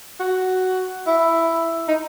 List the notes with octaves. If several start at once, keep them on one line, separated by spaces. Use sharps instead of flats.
F#4
E4
D#4